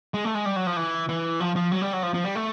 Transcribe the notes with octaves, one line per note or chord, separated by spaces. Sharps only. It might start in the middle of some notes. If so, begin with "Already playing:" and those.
G#3
A3
G#3
G3
F#3
F3
E3
E3
F3
F3
F#3
G3
F#3
F3
F3
G3
A3